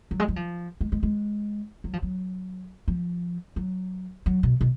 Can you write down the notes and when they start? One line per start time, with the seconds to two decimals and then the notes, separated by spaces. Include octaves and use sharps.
0.11 F#3
0.20 G#3
0.28 F#3
0.36 F3
0.81 G#3
0.92 G#3
1.03 G#3
1.84 F#3
1.93 F3
2.02 F#3
2.88 F3
3.56 F#3
4.26 F#3
4.43 B2
4.61 B2